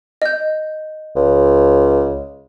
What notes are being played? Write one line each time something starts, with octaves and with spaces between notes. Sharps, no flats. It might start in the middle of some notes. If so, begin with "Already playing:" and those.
D#5 G6
C#2